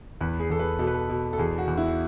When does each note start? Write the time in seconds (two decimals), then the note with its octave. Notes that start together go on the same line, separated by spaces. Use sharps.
0.21 E2 B4
0.40 G#4
0.50 E2 A4
0.59 B4
0.79 B2 A4
0.87 B4
0.94 A4
1.09 B2
1.33 A4
1.38 E2 G#4
1.58 F#4
1.67 E2
1.77 E4